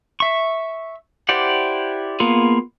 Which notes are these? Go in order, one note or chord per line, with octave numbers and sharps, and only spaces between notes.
E5 C#6
E4 G4 C5 D5 F#5
A#3 B3 F4 G#4